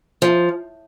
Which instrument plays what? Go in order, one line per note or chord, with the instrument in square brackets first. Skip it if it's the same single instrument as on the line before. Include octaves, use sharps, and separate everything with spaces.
[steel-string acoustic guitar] F3